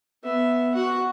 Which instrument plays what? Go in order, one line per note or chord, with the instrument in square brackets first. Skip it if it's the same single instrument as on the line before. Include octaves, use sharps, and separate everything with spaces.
[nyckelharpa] B3 E5
F#4 F#5